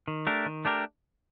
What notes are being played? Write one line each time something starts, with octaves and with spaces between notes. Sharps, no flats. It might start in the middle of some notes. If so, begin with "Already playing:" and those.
D#3
A3 D4 G4 A#4
D#3
A3 D4 G4 A#4